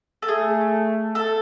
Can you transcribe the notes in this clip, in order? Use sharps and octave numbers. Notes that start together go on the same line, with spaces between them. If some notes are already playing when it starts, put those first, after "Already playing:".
A4
A3 G#4
A4